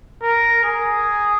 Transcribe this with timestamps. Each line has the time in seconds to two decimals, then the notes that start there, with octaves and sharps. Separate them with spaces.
0.22 A#4
0.64 G#4